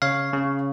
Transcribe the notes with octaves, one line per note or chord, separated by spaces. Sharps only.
C#3 C#5 F5
C#3